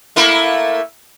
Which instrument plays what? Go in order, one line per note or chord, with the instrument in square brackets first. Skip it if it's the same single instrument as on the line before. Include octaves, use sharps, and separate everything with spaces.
[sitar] A3 A#3 E4